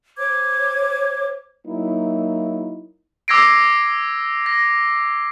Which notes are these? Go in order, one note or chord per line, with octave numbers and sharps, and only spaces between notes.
C5 C#5 D6 G#6
F#3 A#3 D#4 E4
D6 E6 G#6 A#6 C7 D7
A#6